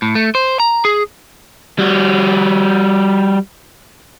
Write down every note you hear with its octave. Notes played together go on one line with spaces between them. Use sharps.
A2
A3
C5
A#5
G#4
G3 F#4